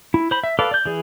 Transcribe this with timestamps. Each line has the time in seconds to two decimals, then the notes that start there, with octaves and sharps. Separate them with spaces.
0.14 E4
0.31 C5 B5
0.44 E5
0.59 A4 B4 D5 F5
0.71 D5 G6
0.86 E3 G#4